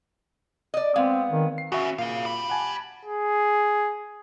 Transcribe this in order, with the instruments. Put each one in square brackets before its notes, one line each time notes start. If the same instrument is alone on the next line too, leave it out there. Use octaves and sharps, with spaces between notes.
[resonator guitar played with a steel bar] D5 D#5
[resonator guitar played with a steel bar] G#3 [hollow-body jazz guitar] B3 F5 [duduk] C4
[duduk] D#3
[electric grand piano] C7
[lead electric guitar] B3 C#4 [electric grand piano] F#4 E5
[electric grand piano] A#2 [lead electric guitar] G#4 F5
[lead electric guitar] G4 B5
[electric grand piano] F#5 G#5 A5
[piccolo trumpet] G#4